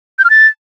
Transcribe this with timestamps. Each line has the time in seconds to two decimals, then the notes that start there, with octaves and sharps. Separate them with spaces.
0.19 G6
0.24 F6
0.30 A6